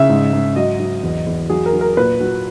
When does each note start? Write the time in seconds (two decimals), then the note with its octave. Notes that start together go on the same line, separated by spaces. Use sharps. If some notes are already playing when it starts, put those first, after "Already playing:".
Already playing: C#3 E5
0.10 G#2
0.33 G#2
0.56 F#3 D#5
0.80 F#3
1.03 E2
1.26 E2
1.50 F#3 G#4
1.66 A#4
1.73 F#3
1.81 A#4
1.97 A#2 B4
2.21 F#3